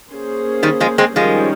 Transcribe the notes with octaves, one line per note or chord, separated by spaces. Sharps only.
A#3 C#4 G#4 C5
D#3 G3
F3 G#3
G#3 C4
D#3 F3 G3 G#3 C#4